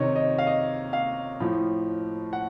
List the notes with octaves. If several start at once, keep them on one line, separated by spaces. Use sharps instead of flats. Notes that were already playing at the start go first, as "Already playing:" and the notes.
Already playing: C3 D#3 C#5 D#5
D#5
F5
D#5
F5
A2 F3
F#5